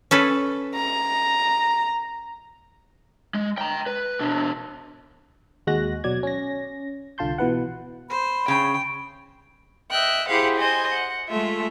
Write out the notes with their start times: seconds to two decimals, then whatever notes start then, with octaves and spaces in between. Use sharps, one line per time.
0.11 C#4 A4 B4
0.75 A#5
3.34 G#3
3.58 G5 A#5
3.86 B4
4.20 B2 D4
5.67 D#2 G#3 F#4 F#6 A#6
6.04 B2 F#3 D5 G#6
6.23 C#4 A#6
7.18 C2 D3 F4 A5 C6 G6
7.38 B2 E3 B4 F#5
8.10 C5 B5
8.48 C#3 G5
9.91 D#5 E5 G5 F#6
10.29 E4 G4 G#4 C5 F5 F#5
10.58 C5 D#5 G#5
10.93 F#5
11.28 G#3 A3 F4 E5